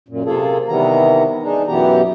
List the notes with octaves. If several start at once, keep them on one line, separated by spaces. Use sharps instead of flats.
F#2 A#2
C3 A#3 F4 G#4 A4
C3 D#3 E3 G3 B3 A#5
G#3 D4 D#4
F#2 B2 E3 B3 G4 A#5